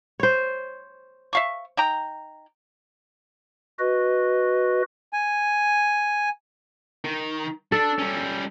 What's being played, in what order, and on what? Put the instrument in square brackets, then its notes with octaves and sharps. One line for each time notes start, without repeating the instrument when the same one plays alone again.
[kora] C5 C#5
[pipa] E5 F5 C#6
D#4 G5 A#5
[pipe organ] F#4 B4 D#5
[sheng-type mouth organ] G#5
[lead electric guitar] D#3
[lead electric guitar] D4 [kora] A4
[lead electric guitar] G3 C#4